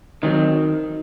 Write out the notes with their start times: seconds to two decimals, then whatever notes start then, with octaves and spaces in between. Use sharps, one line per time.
0.23 D#3 F#3 C4 D#4